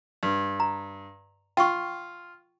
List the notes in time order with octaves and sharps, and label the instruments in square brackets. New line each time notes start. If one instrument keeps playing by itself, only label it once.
[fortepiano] G2
[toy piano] A#5
[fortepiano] F4 [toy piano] G5 C#6